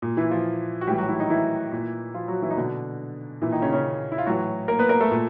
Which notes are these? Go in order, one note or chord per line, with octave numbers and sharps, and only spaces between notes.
A#2
E3 E4
F3 F4
F#4
A2 E3 G3 G4
F#3 F#4
E3 E4
D#3 D#4
E3 E4
A#2
F3 F4
F#3 F#4
E3 E4
D#4
B2 D3 D4
A#2 E3 E4
D#3 D#4
C#3 C#4
C#3 C#4
E4
F4
A2 E3 F#3 F#4
A#3 A#4
B3 B4
A#3 A#4
A3 A4
A#2